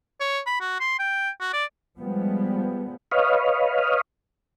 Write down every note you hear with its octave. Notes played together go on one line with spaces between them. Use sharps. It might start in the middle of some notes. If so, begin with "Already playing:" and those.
C#5
B5
F#4
C6
G5
F#4
D5
F3 G3 G#3 B3
B4 C#5 D#5 F5